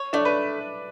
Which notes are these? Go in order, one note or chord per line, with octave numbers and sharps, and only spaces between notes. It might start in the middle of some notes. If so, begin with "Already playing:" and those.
Already playing: C#5
A3 D4 D5
B4